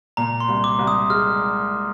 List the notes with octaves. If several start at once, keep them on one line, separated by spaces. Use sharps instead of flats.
A#2 A#5
C6
C2
D6
C2
D#6
G#3 F6